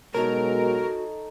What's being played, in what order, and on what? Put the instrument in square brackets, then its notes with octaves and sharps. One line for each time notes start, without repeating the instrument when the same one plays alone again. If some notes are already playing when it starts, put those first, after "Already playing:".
[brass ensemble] B2 F#3 G#3 [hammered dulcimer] D#4 A4 C#5 [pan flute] F#4 [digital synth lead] A#4